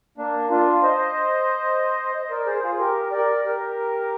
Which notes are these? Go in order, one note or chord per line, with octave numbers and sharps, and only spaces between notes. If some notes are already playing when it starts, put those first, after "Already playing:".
A#3 D4
D4 F4
C5 D#5
C5 D#5
A#4 D5
G#4 C5
F4 G#4
G4 A#4
A#4 D5
G4 A#4